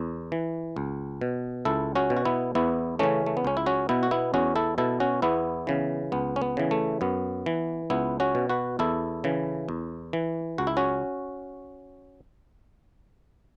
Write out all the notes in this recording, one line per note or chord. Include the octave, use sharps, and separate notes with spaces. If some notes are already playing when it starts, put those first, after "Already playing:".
Already playing: E2
E3
C#2
B2
C#2 E4 A4
C#4 F#4
B2
F#4
B3 E4
E2 B3 E4
C#3 E3 A3 C#4
A3
B3
C#2 C#4
E4
C#4 F#4
B2 B3 E4
F#4
B3 E4
E2 C#4 F#4
E4 A4
B2 E4 A4
C#4 F#4
E2 B3 E4
C#3 E3
C#2 B3
C#4
B3
C#3 E3
A3
F#2 B3
E3
C#2 B3 E4
C#4 F#4
B2
F#4 B4
E2 E4 A4
C#3 E3
E2
E3
C#2 F#4
E4
C#4 F#4